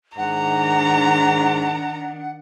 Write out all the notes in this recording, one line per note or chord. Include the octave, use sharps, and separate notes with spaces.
G#2 D#3 D4 F#5 A#5